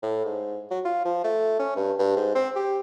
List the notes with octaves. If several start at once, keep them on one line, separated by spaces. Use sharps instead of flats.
A2
G#2
F#3
F4
F3
A3
C#4
G2
G2
G#2
C4
G4